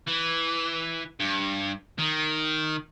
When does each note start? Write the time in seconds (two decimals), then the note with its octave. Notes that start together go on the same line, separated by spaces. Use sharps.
0.08 E3
1.20 G2
1.99 D#3